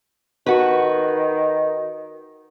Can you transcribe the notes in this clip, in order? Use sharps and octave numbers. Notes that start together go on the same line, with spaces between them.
D#3 F#4 B4